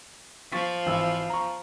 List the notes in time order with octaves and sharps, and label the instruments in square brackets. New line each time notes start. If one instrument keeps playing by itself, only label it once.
[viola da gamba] F3 [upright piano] C#6 A6 B6
[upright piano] G#1 E3 E6
A#5 C#6